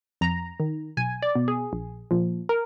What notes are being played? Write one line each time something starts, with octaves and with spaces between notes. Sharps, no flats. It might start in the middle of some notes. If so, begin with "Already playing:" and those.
F2 A#5
D#3
B1 G#5
D5
B2
G#4
A#1
A#2 F3
A#4